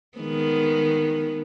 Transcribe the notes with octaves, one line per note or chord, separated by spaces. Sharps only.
D#3 G#3 B3